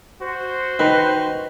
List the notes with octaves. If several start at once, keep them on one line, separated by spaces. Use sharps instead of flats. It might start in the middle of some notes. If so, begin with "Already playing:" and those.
F#4 C5
D#3 B4